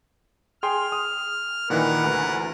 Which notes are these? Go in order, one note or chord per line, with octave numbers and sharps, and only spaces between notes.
G#4 G5 C6 F6
D#6
A#2 D#3 E3 A#4 B4 F#5
D2 E3